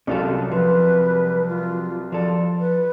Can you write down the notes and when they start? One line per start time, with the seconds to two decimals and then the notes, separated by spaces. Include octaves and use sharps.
0.07 C2 F#3 C#4 F4 A4
0.52 F3 B4
1.49 F4
2.12 F3 A4 D5
2.60 B4